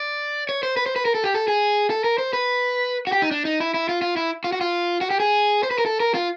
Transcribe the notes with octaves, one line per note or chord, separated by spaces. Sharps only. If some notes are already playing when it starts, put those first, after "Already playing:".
Already playing: D5
C#5
C5
B4
C5
B4
A#4
A4
G4
A4
G#4
A4
A#4
C5
B4
F#4
G4
D#4
D4
D#4
E4
E4
F4
F4
E4
F4
F#4
F4
F#4
G4
G#4
C5
B4
A#4
A4
A#4
F4